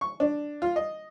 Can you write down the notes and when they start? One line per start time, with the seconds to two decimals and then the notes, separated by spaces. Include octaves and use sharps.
0.01 C#6
0.20 D4
0.62 F4
0.76 D#5